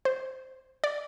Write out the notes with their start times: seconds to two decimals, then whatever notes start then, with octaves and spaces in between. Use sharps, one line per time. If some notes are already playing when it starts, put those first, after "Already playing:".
0.05 C5
0.84 D5